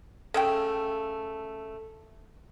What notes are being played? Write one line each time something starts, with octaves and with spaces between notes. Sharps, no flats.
C#3 A3 A4 G5